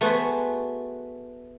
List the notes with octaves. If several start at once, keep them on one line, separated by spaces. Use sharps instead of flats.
A3 B3 F#4 G#4 B4 C5